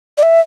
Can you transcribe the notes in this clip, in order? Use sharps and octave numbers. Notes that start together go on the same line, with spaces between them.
D5
E5